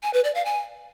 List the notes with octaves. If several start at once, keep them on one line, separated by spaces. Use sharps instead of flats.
G#5
B4
D5
F5
G#5